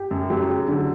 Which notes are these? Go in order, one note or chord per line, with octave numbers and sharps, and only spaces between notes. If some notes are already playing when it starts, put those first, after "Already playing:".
Already playing: G4
F#2
F#3 G4
C#3
D3